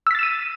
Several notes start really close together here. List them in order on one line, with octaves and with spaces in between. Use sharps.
E6 B6 A6 E7 D#7